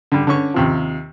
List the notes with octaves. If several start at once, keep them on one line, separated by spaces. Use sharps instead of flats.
D3 G3
D3 C#4 C#6
D#2 C3 F3